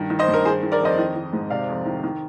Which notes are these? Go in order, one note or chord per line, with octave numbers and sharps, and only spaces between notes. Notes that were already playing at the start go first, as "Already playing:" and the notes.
Already playing: G2 D#3
D#3
C5 D#5
G2
A#4
D#3 G#4 C5
D#3
A#4 D5
F2 C5 D#5
D#3
D#3
G#2
C3 D5 F5
F2
D#3
D#3